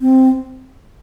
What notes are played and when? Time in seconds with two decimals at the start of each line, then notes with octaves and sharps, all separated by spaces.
0.01 C4